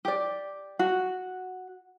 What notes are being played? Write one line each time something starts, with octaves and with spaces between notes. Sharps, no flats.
G4 D5
F#4